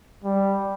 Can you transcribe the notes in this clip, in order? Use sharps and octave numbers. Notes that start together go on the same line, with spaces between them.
G3